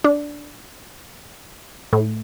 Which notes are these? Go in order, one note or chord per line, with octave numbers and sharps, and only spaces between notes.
D4
A2